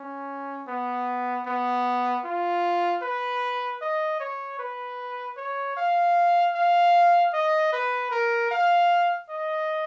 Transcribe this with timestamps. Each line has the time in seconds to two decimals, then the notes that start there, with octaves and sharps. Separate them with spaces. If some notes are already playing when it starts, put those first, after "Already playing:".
Already playing: C#4
0.68 B3
1.46 B3
2.25 F4
3.02 B4
3.82 D#5
4.20 C#5
4.59 B4
5.37 C#5
5.77 F5
6.55 F5
7.33 D#5
7.72 B4
8.11 A#4
8.51 F5
9.29 D#5